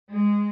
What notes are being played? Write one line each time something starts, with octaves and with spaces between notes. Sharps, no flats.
G#3